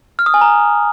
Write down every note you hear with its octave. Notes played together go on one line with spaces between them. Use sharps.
F6
D#6
G#5
A#5